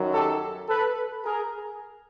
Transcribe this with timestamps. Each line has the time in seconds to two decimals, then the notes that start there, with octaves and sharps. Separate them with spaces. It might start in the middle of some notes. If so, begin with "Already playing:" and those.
Already playing: F#2 D#3 F#3
0.11 G4 A4
0.68 A4 B4
1.24 G#4 A#4